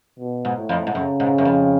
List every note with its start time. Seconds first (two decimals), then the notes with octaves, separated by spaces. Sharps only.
0.19 B2
0.45 G#2
0.57 A2
0.69 F2
0.87 G#2
0.95 F#2 C#3
1.20 G#2
1.38 F#2
1.45 F2